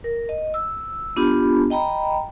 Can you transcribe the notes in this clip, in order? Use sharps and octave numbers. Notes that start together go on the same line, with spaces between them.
A#4
D#5
E6
B3 D4 F4 G4 B5
D#5 G5 A#5 B5